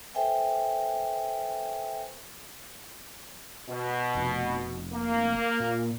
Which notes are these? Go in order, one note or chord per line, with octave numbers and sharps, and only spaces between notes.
A4 B4 C5 E5 G5 G#5
B2
F1
A#3
A#2